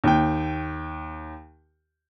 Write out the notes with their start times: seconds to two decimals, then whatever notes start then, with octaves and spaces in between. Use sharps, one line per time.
0.04 D#2 G5